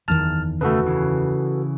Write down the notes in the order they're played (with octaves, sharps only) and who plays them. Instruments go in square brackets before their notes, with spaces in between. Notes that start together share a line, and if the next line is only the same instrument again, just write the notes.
[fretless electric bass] F#1 E2 D#3 [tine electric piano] A5 F6
[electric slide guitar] C#3 A3 [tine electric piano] F#4 A4 B4
[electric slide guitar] C#3 E3